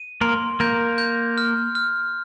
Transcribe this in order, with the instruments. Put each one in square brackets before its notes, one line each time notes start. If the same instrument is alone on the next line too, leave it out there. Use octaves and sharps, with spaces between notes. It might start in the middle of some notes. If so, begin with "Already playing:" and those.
Already playing: [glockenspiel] D#7
[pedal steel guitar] A#3 A#4 [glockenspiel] C6
[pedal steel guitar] A#3 A#4 [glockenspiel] G6
[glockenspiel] G6
F6
F6